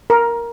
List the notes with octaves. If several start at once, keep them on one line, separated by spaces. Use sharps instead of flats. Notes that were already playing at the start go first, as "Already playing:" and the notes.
A#4